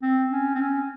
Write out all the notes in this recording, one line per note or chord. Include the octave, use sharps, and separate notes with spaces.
C4
C#4
C4
C#4